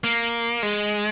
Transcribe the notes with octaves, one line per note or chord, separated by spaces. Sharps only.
A#3
G#3